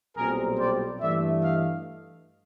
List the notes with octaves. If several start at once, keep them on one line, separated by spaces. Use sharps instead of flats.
B1 A#2 G3 C4 G#4 A#4
C5 D5
G2 E3 A3 D5 E5
D#5 F5